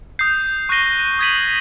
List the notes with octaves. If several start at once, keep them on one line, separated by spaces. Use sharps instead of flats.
D#6 G6 C7
C#6 F#6 A#6 D#7 G7
D#6 G#6 B6 D#7 F#7